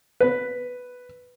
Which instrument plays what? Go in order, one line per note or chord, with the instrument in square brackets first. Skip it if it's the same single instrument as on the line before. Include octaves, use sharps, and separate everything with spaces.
[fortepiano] B4